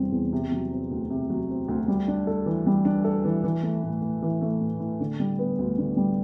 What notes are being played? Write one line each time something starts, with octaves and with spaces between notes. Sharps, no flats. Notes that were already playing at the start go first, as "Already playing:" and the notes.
Already playing: E2 C3 G3 C4
E2
C3
F#3
C4
D2
C3
F#3
C4
D2
G3
D4
A4
E3
G3
D4
A4
E3
E3
A3
A2
A2
E3
A3
A2
A2
D3
G3
B3
D2
D3
G3